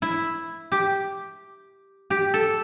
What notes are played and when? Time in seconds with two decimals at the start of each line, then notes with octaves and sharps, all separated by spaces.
0.02 E4
0.72 G4
2.10 G4
2.34 A4